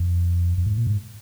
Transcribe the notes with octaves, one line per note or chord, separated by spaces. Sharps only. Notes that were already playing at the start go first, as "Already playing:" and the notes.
Already playing: F2
F2
G#2
A#2
G#2